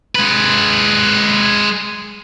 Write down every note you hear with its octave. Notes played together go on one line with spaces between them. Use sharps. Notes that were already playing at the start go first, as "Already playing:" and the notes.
G#3 B4